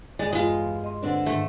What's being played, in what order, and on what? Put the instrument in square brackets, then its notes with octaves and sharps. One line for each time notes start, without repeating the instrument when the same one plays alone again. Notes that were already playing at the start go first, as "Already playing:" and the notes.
[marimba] G2 [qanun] G#3 [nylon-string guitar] D5
[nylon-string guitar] E2 [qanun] G#3 F4
[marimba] D#5 C6
[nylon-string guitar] D3 C4 D4 [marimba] B4
[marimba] G#2 D#3 [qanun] A3